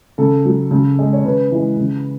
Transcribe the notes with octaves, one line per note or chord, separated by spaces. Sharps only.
C#3 A4
F#3
C#3
G#3
C#5
C#3 B4
E3 G#3
C#3